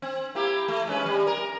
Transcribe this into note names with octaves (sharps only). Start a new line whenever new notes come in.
C4
A#3 E4 G4
A3
G#3 C#4 B4
G3
A#4